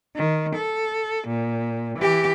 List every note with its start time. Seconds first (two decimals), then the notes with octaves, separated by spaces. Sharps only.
0.16 D#3
0.55 A4
1.27 A#2
1.99 E3 G4